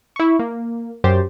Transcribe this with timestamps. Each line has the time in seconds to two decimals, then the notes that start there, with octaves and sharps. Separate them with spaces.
0.16 E4 C#6
0.39 A#3
1.04 F#2 G4 C5 A6